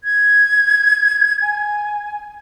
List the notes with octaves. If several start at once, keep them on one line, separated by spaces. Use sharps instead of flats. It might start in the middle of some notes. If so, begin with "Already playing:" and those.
G#6
G#5